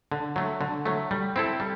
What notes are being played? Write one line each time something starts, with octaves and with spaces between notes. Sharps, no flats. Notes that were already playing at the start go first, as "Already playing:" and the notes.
D3
F#3 A3
D3
F#3 A3
G3
C4 E4 A4
G3